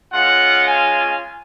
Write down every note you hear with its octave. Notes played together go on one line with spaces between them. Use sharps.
G#3 C#4 F4 F#5
G#5